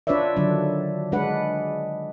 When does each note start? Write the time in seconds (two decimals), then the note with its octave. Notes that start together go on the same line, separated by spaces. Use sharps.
0.07 D4 F4 B4 C#5 D5 E5
0.36 D3 D#3 F#3 D4
1.12 G#3 D4 B4 F#5